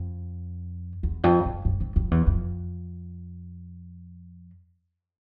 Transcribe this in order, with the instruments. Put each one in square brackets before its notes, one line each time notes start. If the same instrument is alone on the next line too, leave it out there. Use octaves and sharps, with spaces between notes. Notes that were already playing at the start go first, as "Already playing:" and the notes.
Already playing: [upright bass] F2
E2
F2
F#2
F#2
F2
F2
E2
F2